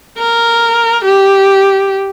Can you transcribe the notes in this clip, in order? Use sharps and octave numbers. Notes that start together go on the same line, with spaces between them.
A#4
G4